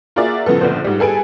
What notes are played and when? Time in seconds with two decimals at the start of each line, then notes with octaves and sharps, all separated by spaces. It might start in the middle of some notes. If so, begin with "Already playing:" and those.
0.16 A#3 F4 F#4 G#4 D5 E5
0.46 A2 C#3 F3 B3 A4
0.61 A#1 D3 B3 C5
0.84 G#2 G3
0.99 G3 G#4 A4 B4 G#5 D7